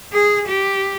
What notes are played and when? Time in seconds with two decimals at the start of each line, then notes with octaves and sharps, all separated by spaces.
0.13 G#4
0.48 G4